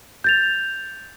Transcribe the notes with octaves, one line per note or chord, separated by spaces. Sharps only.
G6 A6 F7